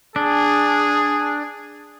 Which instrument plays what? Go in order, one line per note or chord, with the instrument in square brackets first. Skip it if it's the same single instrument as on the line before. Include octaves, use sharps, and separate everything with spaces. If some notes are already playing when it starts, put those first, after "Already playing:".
[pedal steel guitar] D4 [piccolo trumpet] G#4